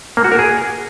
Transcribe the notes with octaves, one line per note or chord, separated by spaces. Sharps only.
A#3
F#4
A#4
G#4